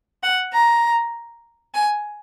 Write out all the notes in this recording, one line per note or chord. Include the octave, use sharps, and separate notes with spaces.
F#5
A#5
G#5